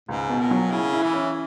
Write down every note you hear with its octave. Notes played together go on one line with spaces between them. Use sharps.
C#2 G#2
B2
A#2
F#3
C#3 E4
E4
E3
C#4